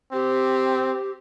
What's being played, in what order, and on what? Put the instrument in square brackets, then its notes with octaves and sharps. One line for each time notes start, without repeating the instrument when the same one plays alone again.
[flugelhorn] C4 [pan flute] G4